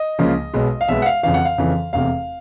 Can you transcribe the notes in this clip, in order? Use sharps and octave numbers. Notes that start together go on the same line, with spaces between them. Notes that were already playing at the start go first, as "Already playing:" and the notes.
Already playing: D#5
C#2 C#3 F3 A#3
B1 B2 G#3 B3
F5
B1 B2 G#3 B3 E5
F#5
F5
F2 C#3 E3 F5
F#5
F5
F2 C#3 E3
F1 E2 C3 F5